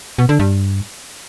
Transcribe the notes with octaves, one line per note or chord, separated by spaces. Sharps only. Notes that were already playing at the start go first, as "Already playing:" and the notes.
B2
D3
G2